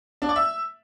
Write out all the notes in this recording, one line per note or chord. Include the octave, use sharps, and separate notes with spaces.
D4
D5
E5